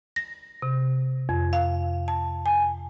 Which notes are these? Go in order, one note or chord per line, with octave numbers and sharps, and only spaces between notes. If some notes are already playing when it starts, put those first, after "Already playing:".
A#6
C3
F2
F5
A5
G#5